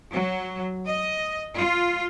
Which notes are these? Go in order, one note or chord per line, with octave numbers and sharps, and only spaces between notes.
F#3
D#5
F4